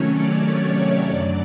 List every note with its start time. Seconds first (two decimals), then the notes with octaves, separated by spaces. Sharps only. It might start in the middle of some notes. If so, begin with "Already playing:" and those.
Already playing: C3 D#3 F#3 A3 C#4 C#5
0.11 D5
0.43 D5
1.08 F#2 D3 F#3